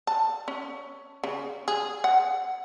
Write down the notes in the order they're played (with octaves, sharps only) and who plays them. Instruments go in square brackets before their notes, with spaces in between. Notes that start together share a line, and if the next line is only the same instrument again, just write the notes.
[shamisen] A5
C#4
C#3
G#4
F#5